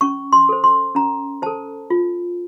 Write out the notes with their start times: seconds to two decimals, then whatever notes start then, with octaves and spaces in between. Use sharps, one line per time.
0.01 C#4 C#6
0.32 C6
0.49 A4 C5
0.64 C6
0.95 C#4 A#5
1.42 A4 C5 A5
1.90 F4